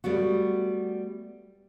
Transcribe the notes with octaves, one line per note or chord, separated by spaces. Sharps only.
G3 A3 B3 F#4